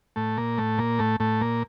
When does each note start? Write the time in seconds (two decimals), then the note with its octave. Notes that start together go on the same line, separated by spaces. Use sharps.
0.16 A2 A3
0.37 A#2 A#3
0.58 A2 A3
0.78 A#2 A#3
0.99 A2 A3
1.20 A2 A3
1.41 A#2 A#3